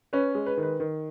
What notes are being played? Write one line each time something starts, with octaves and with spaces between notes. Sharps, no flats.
C#4 B4
G#3
B4
D#3
B4
D#3